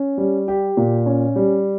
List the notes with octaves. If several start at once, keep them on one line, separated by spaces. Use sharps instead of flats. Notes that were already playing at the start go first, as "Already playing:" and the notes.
Already playing: C#4
G3
G4
A#2
C#4
G3